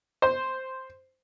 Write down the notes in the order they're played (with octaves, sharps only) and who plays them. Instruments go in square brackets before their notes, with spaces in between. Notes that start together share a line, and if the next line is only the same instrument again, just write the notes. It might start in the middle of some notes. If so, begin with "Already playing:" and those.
[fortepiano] C5